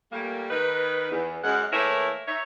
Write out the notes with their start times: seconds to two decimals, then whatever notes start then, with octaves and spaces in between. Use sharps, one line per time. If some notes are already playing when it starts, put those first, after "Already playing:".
0.13 A#2 G3 A3 A#3
0.51 D#3 D#4 B4
1.11 E2
1.44 F#2 G#3 F#5
1.72 E3 A3 A#3 E4 A#4 C#5
2.28 D#4 C#5 E5